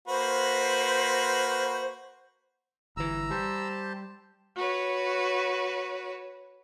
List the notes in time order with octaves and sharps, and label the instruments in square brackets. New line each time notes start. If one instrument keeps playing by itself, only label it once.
[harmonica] A#3 F#4 B4 [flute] C5
[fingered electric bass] G1 E3 [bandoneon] A#5 E6
[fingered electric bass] G3 [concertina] G4 C5 A5
[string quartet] F#4 B4 C#5